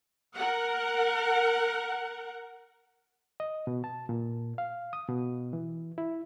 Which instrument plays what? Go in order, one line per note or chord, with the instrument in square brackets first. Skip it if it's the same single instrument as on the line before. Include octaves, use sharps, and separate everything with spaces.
[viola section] A#4 F#5
[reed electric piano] D#5
B2
A5
A#2
F5
D#6
B2
E3
E4